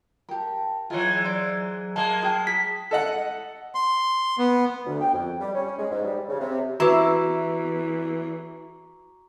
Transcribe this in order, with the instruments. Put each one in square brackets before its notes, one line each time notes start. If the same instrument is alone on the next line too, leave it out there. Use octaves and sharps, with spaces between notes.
[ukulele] G4 A#4 [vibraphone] G5 A5
[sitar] E3 G#3 [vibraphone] F#3 A#5 [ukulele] F4 C#5
[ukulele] C5 D5
[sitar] G#3 A#3 [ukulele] A5
[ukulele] G#4 G5 A5
[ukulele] G#4 A5 [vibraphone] A#5 [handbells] B6
[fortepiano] A4 D#5 F#5
[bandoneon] C6
B3
[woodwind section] D2
G5
F2
G3
C#4
G#3
G#2
G3
C#3
C3
[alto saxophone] E3 [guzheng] E4 [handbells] F#4 B4 [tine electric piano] A#5 C#6 D6